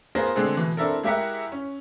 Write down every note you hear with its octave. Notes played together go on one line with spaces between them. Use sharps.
B3 F4 G#4 A#4 C5
D3 G#3 C4 G#4 A4
B2 E3
C4 D4 E4 A4 A#4
G#3 E4 G4 A#4 E5 F#5
C#4